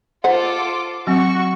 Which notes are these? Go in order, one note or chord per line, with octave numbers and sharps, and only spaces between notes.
F4 A4 C5 F#5 D6
F#3 C4 F#4 C#6